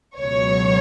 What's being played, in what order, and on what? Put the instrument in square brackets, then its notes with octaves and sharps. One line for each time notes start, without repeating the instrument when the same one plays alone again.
[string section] C#2 B2 F#3 C#5